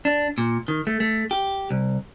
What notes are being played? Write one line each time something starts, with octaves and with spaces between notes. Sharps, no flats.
D4
A#2
D#3
A3
A3
G4
C2